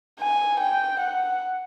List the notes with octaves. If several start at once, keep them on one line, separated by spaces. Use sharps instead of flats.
G#5
G5
F#5